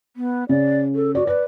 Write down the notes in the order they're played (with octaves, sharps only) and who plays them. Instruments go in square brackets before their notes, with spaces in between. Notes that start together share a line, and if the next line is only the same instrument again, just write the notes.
[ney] B3
[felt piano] C#3 [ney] D5
[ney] A4
[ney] F#4 [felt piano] D5
[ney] B4 [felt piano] D5